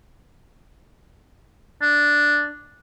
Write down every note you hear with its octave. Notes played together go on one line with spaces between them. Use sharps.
D4